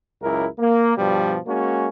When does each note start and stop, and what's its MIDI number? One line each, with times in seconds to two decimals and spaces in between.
0.21 0.46 37
0.21 0.46 42
0.21 0.46 64
0.21 0.46 70
0.59 0.94 58
0.97 1.37 43
0.97 1.37 47
0.97 1.37 53
0.97 1.37 55
1.47 1.88 56
1.47 1.88 58
1.47 1.88 61
1.47 1.88 66